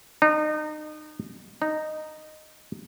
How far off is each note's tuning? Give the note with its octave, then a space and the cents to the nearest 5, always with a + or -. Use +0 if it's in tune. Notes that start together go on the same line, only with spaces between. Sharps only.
D#4 -30
D#4 -10